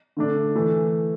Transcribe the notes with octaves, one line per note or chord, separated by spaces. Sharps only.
D3 A3 D4
E3 A3